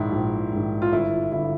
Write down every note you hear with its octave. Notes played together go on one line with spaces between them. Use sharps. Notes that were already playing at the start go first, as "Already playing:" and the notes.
Already playing: A#1 G#2 D#3 E4
A#1
G#2 D#3
F4
G1 E4
G2 D3 E4